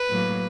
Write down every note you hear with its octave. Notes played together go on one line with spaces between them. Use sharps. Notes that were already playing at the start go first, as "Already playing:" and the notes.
Already playing: B4
A2 F#3 A#3